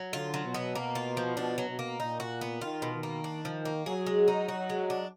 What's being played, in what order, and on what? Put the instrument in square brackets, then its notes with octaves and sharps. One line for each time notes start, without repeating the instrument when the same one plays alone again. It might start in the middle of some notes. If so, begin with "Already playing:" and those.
Already playing: [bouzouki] F#3
[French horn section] D3 [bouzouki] F4
[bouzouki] F#3
[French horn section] B2
[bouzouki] B3
A#3
F4
F3
[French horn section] B2 [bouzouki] D4
[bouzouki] F#3
[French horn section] B2
[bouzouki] A#3
[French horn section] A#2 [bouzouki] D#4
[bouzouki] F#4
B3
[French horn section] D#3 [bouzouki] F4
[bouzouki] B2
[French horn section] D#3
[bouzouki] A#3
D4
F3
A#3
[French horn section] F#3 [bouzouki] G#4
[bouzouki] G#3
D#4
[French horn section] F#3 [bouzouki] F#4
[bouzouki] G#3
D4